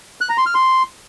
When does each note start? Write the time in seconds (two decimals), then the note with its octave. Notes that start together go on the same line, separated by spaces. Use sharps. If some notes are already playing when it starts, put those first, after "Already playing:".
0.21 F#6
0.29 A#5
0.38 C6
0.46 F6
0.54 C6